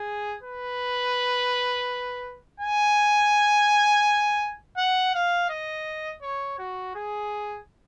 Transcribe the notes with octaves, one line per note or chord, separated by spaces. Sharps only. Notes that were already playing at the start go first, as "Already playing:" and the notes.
Already playing: G#4
B4
G#5
F#5
F5
D#5
C#5
F#4
G#4